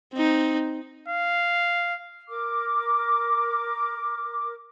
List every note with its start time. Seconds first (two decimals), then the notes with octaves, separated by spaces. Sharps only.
0.14 C4 D#4
1.08 F5
2.28 A#4 D6